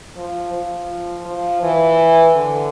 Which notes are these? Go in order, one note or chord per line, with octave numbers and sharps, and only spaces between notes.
F3
F3
F3
E3
D3